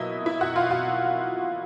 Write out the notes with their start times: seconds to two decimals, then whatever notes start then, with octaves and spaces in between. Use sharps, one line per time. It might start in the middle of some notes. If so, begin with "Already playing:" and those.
Already playing: B2 F#3 A#3 E4 D#5 E5
0.26 E4 E5
0.41 F#4 F#5
0.56 F4 F5
0.70 F#4 F#5